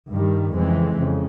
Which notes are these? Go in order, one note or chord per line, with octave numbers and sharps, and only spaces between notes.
G2 D#3 G3
F2 C#3 E3 G#3 C4
F2 C#3